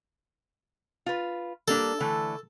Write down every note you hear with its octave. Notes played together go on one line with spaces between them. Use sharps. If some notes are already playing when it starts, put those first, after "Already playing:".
F4 B4
G3 A#3 D4 A4
D3 E3 A3